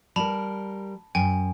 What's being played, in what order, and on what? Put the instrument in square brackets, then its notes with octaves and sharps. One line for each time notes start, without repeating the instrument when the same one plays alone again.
[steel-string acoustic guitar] G3 A#4 [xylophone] A5 B5 F7
[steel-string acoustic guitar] F#2 [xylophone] G5 G#5